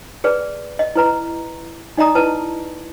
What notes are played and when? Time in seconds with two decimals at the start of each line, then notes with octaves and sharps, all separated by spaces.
0.24 G#4 B4 D5
0.79 D#5
0.95 E4 B4 A#5
1.97 D#4 D5 D#5 A#5 D#6
2.15 E4 B4 A5